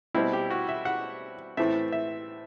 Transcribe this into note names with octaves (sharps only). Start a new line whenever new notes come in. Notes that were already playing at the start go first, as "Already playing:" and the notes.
B2 G3 C4 E4
G4
F#4
E5
F#5
A2 E3 A3 C4 E5
E5